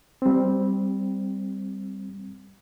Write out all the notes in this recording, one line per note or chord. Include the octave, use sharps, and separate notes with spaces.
G3 C4